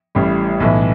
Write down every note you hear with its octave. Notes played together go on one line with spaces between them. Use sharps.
A1 A2 G3
B1 A2 E3